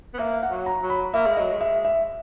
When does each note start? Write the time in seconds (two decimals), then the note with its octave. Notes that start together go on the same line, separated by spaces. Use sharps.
0.14 B3
0.19 A#3 E5
0.43 F#5
0.50 F#3
0.66 A#5
0.83 F#3
0.90 B5
1.14 A#3 E5
1.27 G#3
1.37 F#3 D#5
1.53 G#3
1.61 E5
1.85 E5